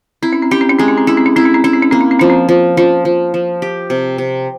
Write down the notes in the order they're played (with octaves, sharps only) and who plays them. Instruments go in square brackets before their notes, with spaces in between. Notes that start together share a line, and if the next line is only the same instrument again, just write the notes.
[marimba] C4 [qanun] E4
[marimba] C#4
C4
[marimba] C#4 [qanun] G4
[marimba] C4
C#4
[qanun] G#3 [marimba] C4
[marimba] C#4
C4
[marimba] C#4 [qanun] E4
[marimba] C4
C#4
[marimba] C4 [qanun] E4
[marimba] C#4
C4
[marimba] C#4 [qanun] E4
[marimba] C4
C#4
[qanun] A#3 [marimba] C4
[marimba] C#4
C4
[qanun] F3 [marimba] C#4
[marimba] C4
[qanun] F3
[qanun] F3 [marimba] C#4
[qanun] F3
F3
G4
C3
C3